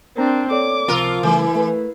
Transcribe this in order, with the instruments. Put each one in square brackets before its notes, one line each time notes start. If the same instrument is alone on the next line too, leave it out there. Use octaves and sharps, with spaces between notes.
[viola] C4 D4 [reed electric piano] A#4 A#5
[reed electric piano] A4 D5 [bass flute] C#5 [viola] D6
[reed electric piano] C#2 C3 E6 [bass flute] F3 [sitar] F4 A#4
[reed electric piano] C#3 G3 A3 [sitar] E3 [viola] E4
[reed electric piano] A3 [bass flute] B4